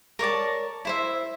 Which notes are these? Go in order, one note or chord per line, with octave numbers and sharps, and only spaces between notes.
A#4 C#5 D5 A5
E4 C5 E5